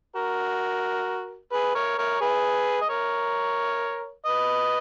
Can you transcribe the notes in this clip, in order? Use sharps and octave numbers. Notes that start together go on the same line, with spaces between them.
F#4 A#4
G#4 B4
A#4 C#5
A#4 C#5
G#4 B4
D#5
A#4 C#5
B4 D#5